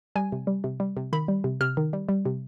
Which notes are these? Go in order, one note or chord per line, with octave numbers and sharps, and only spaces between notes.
G3 G#5
C3
G3
C3
G3
C3
D#3 B5
G3
C3
C3 F6
D#3
G3
G3
C3